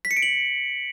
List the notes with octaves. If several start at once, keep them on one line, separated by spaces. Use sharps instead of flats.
B6
C#7
D7
F#7